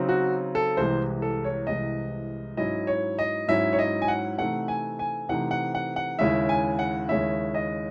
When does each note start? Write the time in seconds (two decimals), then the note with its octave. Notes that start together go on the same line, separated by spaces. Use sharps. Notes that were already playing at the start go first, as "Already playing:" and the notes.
Already playing: C#3 F#3 C4 D#4
0.09 F#4
0.55 A4
0.77 C2 C3 E3 G#3 C5
1.22 A4
1.44 C#5
1.67 C2 C3 E3 G#3 D#5
2.57 G#2 F#3 C#4 E4 D#5
2.87 C#5
3.19 D#5
3.48 G#2 F#3 C#4 E4 E5
3.73 C#5
3.79 D#5
4.02 G#5
4.08 F#5
4.38 C3 E3 A3 C4 D#4 F#5
4.68 G#5
4.99 G#5
5.29 C3 E3 A3 C4 D#4 F#5
5.51 F#5
5.75 F#5
5.96 F#5
6.19 D#2 C#3 G#3 C#4 E4 E5
6.49 G#5
6.79 F#5
7.09 D#2 C#3 G#3 C#4 E4 E5
7.54 D#5